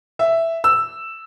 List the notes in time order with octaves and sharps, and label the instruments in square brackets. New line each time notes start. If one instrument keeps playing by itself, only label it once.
[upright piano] E5
E6